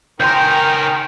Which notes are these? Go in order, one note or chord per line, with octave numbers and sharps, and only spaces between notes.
C#2 D#3 A#4 G5 G#5 C6 G6